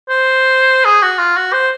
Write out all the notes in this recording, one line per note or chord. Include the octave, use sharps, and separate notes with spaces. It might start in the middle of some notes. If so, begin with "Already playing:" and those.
C5
G#4
F#4
F4
F#4
C5